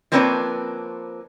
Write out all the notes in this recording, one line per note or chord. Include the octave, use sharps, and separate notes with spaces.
F3 A#3 C4 D4 B4 C#5